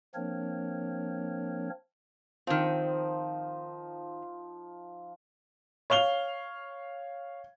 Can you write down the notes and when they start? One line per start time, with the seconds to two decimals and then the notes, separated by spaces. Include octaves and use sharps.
0.15 F3 A#3 C4 D4 A#4 C#5
2.47 D#3 F3 C4 D#4
5.90 C#5 F5 F7 G7